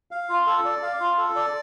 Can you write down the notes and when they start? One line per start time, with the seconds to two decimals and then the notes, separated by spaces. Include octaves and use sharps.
0.11 F5
0.29 F4
0.47 A4
0.65 D5
0.82 F5
1.00 F4
1.18 A4
1.36 D5